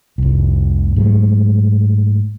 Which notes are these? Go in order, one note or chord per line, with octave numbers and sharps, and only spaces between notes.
F1 C2
G#2 F#3 G#3 A3